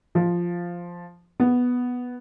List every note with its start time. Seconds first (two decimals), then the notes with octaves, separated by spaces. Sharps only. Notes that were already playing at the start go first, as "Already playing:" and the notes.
0.15 F3
1.40 B3